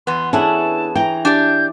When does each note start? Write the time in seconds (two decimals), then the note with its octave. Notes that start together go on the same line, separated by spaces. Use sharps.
0.07 E2 B3 C6
0.33 C#4 D4 E4 G#4 A4 A5
0.95 E3 G5 A#5
1.25 D4 G4 D5 G6